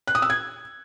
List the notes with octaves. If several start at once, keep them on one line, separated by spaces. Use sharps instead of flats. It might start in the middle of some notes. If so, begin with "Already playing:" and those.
F#6
D#6
E6
G#6